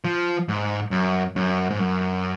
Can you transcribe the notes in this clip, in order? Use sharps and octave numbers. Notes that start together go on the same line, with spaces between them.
F3
G#2
F#2
F#2
G#2
F#2